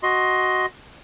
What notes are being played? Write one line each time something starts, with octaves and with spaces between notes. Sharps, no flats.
F#4 D#5 C6